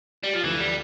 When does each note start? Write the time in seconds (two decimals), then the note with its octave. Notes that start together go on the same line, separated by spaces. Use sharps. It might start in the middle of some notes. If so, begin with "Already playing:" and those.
0.23 G3
0.33 F3
0.43 D2 D3 E3 F3
0.60 G3